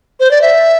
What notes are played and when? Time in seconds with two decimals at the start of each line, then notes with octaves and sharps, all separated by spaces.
0.20 C5
0.31 D5
0.42 E5